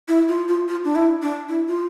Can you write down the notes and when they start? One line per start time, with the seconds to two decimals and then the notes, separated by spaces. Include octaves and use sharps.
0.08 E4
0.28 F4
0.48 F4
0.68 F4
0.84 D4
0.95 E4
1.22 D4
1.49 E4
1.68 F4